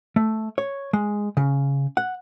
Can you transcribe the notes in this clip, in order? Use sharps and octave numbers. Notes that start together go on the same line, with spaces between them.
A3
C#5
G#3
C#3
F#5